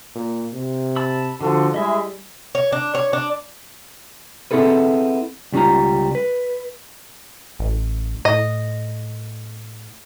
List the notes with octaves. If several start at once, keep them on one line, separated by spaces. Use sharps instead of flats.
A#2
C3
A5 B5 E6
D3 F3 F#4 A4
G3 G#3 E4 G#4 D#5 E5
C#5
D4
C#5
D4
B3 C4 E4 G#4 A4 B4
C#2 G3 C#4 F4 A#5
B4
A1
A2 D#5